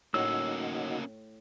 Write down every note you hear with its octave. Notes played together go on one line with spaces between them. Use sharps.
A2 A#3 C#4 D#4 F#4 E6